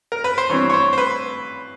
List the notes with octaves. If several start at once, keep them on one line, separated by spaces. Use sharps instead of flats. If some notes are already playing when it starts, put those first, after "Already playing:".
A#4
B4
C5
G2 E3 G3 C4 C#5
C#5
C5
C5
B4